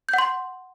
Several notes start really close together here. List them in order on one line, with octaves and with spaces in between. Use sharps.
G6 F#5 C6